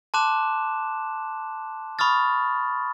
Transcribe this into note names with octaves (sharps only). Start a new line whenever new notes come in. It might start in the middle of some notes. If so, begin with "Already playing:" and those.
A5 C6 D6 F#6 E7
B5 C#6 D#6 F6 A6